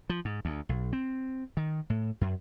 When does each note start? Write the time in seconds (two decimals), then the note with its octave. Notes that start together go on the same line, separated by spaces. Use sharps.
0.10 F3
0.25 G#2
0.45 D2
0.69 B1
0.93 C4
1.57 D#3
1.90 A2
2.21 F#2